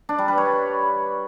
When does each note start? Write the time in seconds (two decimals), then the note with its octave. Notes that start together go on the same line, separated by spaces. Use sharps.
0.09 D4
0.18 G3
0.28 B4
0.38 C#5